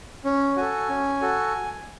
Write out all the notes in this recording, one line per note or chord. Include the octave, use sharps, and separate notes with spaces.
C#4
F#4 A4 G#5
C#4
F#4 A4